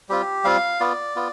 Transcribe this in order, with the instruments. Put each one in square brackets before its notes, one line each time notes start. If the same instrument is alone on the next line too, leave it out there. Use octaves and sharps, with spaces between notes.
[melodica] G3 C4 F4 G4
G3 C4 F4 F5
B3 F4 D5
B3 F4